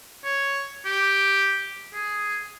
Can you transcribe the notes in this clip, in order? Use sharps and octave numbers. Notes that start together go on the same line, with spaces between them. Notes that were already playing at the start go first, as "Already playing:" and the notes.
C#5
G4
G#4